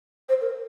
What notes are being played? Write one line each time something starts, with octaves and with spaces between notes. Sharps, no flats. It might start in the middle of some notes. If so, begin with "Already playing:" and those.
C5
A#4